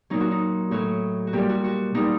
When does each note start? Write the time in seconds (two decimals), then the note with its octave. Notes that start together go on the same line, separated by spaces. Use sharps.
0.10 A#2 F#3 D#4
0.20 F#4
0.31 D#4
0.71 A2 F#3 F#4
1.27 F#4
1.33 A#2 G3 G4
1.49 F#4
1.64 F#4
1.94 A#2 G3 D#4